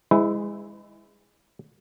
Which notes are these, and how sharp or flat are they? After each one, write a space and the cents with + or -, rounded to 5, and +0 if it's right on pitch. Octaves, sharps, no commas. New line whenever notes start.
G#3 -15 E4 -10 B4 +45